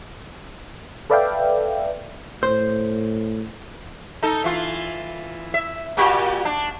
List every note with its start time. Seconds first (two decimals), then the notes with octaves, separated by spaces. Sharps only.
1.10 A4 B4 D5 E5 F5 G5
2.43 A2 C5
4.23 D#4 A4
4.44 E3 F4
5.54 E5
5.97 A#2 F#4 G4
6.45 D4